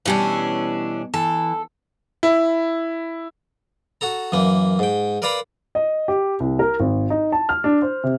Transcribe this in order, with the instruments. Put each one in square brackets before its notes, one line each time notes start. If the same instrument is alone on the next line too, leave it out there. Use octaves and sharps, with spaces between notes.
[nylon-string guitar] B2 G3 G4 [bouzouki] E3 C#4 D4
[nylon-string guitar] E3 [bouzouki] A4
[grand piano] E4
[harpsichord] F#4 A4 A#5
F#2 E3 A#3
G#2 G5
A#4 B4 D5 F5 A#5 B5
[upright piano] D#5
G4
C2
A#4
G#1
D#4
A5
F6
D4
C5
C3